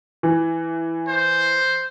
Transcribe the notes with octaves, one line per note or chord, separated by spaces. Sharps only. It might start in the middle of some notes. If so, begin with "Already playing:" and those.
E3
C5